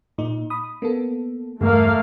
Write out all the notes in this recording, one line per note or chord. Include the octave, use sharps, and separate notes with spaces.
A#2 D#4
B5 D#6
A#3 B3 A4
E2 G2 C#3 A3 A#3 F5